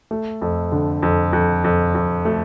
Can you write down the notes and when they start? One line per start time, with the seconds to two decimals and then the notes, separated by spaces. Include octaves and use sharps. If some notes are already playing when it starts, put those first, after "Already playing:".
0.11 A3
0.42 F2
0.72 D3
1.03 F2
1.33 F2
1.64 F2
1.95 F2
2.25 A3